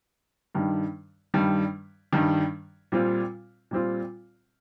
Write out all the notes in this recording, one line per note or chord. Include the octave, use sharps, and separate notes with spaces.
G2 D#3 G3
G2 D#3 G3
G2 D#3 G3
A#2 G3 C4 F4
A#2 G3 C4 F4